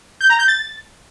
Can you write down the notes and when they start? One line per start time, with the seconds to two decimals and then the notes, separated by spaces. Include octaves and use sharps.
0.21 G6
0.30 A#5
0.39 G6
0.48 A6